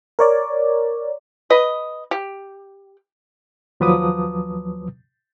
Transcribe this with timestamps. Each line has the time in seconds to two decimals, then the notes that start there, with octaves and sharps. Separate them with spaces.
0.19 A#4 C#5 D5
1.50 B4 D#5
2.11 G4
3.80 D#2 F3 F#3 B4 D6 D#6